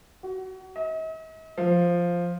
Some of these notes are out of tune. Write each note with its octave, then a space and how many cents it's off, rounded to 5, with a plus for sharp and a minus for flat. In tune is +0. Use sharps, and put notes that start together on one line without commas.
F#4 +30
D#5 +45
F3 +0